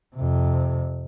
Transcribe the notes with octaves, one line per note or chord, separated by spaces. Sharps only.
F2 C3